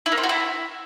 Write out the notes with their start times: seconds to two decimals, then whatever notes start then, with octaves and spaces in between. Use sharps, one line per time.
0.06 E4
0.12 A#3
0.18 C4
0.23 F#4
0.29 E4